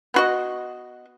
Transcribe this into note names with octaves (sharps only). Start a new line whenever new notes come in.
B3 F#4 D#5